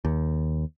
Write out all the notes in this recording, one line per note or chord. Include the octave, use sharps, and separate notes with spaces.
D#2